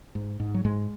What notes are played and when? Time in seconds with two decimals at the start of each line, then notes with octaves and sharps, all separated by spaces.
0.15 G#2
0.40 G#2
0.54 F#3
0.65 G#2 G#3